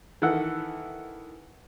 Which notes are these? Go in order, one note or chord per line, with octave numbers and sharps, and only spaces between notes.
D#3 E3 E4 A4 F#5